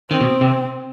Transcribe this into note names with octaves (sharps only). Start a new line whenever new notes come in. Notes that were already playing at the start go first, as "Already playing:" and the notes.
D#3 C4
B2
C3